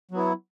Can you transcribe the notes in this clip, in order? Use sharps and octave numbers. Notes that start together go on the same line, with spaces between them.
F#3 B3 E4